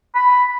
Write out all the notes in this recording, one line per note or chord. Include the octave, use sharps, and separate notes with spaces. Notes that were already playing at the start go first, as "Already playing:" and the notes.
B5